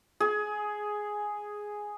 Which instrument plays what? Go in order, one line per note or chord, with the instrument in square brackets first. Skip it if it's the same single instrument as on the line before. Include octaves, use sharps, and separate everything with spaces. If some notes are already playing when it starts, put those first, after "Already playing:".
[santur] G#4